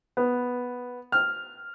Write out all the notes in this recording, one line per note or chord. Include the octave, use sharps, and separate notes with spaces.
B3
F6